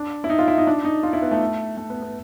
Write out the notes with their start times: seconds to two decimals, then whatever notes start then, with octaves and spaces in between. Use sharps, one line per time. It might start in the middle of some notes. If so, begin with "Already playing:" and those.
Already playing: D4
0.24 E4
0.30 D#4
0.39 F4
0.48 E4
0.58 D#4
0.67 D4
0.85 D#4
1.03 F4
1.13 E4
1.22 B3
1.31 A3
1.77 A3
1.90 B3
2.02 B3